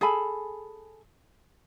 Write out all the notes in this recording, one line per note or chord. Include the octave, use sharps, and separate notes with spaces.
G#4 A4 G#5 B5